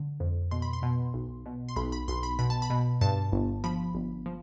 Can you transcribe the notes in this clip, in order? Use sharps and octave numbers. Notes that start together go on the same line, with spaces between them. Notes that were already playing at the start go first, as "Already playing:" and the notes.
Already playing: D3
F2
B2 C6
B5
C6
B2
B1
B2
C6
B1 B5
B5
B1 C6
B5
B2 B5
A5
B5
B2
G2 A5
G1
F3 B5
G1
F3